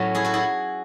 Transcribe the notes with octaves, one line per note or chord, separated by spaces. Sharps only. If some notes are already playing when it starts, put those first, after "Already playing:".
Already playing: A2 F#3 A3 C#4
E4 G#4
F#4 A4
E4 G#4